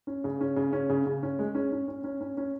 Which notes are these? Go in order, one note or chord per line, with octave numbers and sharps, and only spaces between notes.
C#4
C#3
C#4
C#3
C#4
C#3
C#3
C#4
G#3
C#4
C#4
C#4
C#4
C#4
C#4